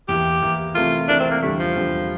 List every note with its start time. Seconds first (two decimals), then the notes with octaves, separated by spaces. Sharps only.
0.08 E2 E3 A#3 G4
0.42 E2 E3 A#3
0.75 C3 E3 A3 E4 F4 A#4
1.08 C3 E3 A3 D4 E4 A#4
1.20 C4
1.31 A#3
1.42 E2 D3 G3 A3
1.60 F3
1.76 E2 D3 G3